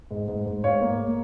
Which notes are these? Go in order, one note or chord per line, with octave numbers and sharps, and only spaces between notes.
G#2
G#2
G#2
G#2 C#5 F5
A#3